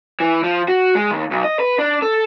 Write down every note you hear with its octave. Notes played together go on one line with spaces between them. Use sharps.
E3
F3
F#4
G#3
D#2
B1
D#5
B4
D4
A4